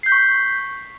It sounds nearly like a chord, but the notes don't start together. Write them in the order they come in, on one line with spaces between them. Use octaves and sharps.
C7 G6 B6 C#6